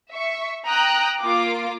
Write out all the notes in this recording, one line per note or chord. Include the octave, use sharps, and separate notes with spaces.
E5 C#6
G5 A#5 D#6 F#6
A#3 F4 D6